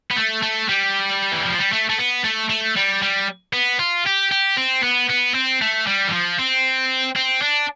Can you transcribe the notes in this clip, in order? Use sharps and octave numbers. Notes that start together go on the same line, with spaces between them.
B3
A3
A3
G3
E3
F3
G3
A3
A3
B3
A3
A3
G3
G3
B3
F4
G4
G4
C4
B3
B3
C4
A3
G3
E3
F3
C4
C4
D4